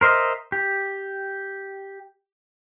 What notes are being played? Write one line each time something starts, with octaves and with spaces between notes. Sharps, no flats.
A#4 C5 D#5 E5
G4